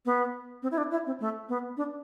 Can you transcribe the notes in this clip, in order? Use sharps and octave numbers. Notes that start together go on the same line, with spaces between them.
B3
C4
E4
D4
E4
C4
A3
B3
D4